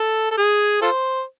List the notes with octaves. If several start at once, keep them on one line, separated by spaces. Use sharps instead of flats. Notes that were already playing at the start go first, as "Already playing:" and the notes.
Already playing: A4
A4
G#4
F4 A4 C5